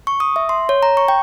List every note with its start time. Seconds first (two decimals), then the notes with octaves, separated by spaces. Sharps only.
0.07 C#6
0.20 D#6
0.36 E5
0.49 C6
0.69 C#5
0.83 A#5
0.97 C#6
1.08 G5